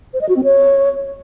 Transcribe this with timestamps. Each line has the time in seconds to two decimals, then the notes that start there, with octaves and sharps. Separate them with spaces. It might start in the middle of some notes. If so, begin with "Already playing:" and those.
0.14 C5
0.21 D#5
0.29 F#4
0.36 C4
0.44 C#5